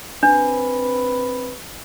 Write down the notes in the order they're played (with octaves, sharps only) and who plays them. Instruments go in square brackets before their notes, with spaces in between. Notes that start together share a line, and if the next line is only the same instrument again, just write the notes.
[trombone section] C4 B4 [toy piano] D4